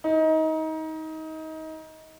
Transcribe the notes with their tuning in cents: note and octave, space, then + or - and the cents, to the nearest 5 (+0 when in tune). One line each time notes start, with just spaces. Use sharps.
D#4 +25